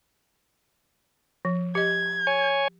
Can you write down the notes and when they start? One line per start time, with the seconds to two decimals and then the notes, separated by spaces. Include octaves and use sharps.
1.45 F3
1.75 G4 D#5 G#6
2.27 C#5 G#5